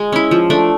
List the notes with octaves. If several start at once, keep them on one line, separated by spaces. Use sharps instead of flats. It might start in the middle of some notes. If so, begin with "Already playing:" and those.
Already playing: G#3
C#4 E4
F3
A3 D4